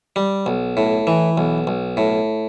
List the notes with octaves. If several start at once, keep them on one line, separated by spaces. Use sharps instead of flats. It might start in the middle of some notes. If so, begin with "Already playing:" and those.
G3
B1
A2
E3
B1
B1
A2